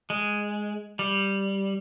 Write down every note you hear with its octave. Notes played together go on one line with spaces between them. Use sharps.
G#3
G3